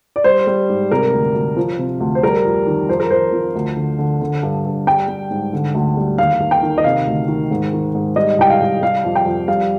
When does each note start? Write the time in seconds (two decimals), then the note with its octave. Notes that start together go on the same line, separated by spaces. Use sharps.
0.16 D5
0.24 G3 C5
0.47 G3
0.69 G#2
0.91 C3 A#4
1.13 D2
1.34 D2
1.57 F3
1.78 C3
2.00 D2
2.15 C5
2.23 G3 A#4
2.45 F2
2.67 D#3
2.89 F2 C5
3.00 A#4
3.10 F2 C5
3.32 F3
3.55 D2
3.77 D3
3.99 D3
4.21 D3
4.43 G2
4.65 G2
4.87 G3 G5
5.08 G3
5.31 G#2
5.53 D3
5.74 D2
5.97 G3
6.18 D#2 F5
6.40 D#2
6.51 G5
6.63 D#3
6.78 D#5
6.84 C3 F5
7.07 D2
7.28 D#3
7.51 G#2
7.73 D#3
7.94 G#2
8.16 G3 D#5
8.38 C2 G5
8.50 F5
8.61 C2
8.82 G3 F5
9.04 F2
9.16 G5
9.26 F2
9.48 G3 F5